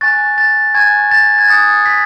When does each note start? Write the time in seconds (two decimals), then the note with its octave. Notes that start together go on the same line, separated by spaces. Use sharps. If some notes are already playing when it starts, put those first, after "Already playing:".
0.01 G#5 C#6 F#6 A6
0.38 A6
0.74 G#5 C#6 F#6 G#6
1.11 A6
1.38 G#6
1.48 G#5 D#6 F#6 A6
1.85 B6